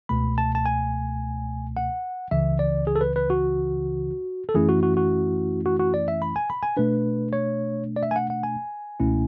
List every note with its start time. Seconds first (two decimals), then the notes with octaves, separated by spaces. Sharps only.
0.09 C#2 B2 A3 B5
0.38 A5
0.55 A5
0.66 G#5
1.77 F#5
2.31 C#2 C#3 E3 E5
2.59 D5
2.87 G#4
2.96 A4
3.01 B4
3.16 B4
3.30 F#4
4.49 A4
4.55 F#2 E3 A3 C#4 E4 G#4
4.69 F#4
4.83 F#4
4.97 F#4
5.66 F#4
5.79 F#4
5.94 D5
6.08 E5
6.22 B5
6.36 G#5
6.50 B5
6.63 G#5
6.77 B2 A3 D4 B4
7.33 C#5
7.96 D5
8.03 E5
8.11 G#5
8.16 F#5
8.30 F#5
8.43 G#5
9.00 C#2 B2 A3 C#4 E4